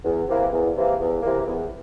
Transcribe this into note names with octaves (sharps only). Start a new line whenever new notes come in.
E2
C3 E3 A#3
E2
C3 E3 A#3
E2
C3 E3 A#3
E2